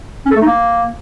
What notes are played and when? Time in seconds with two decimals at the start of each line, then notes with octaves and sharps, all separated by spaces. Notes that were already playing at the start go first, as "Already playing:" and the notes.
0.26 C#4
0.31 A4
0.36 A3
0.42 D#4
0.47 A#3